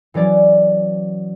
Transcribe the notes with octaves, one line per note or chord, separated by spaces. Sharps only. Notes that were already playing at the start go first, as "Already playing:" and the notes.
E3 F#3 C#4 D5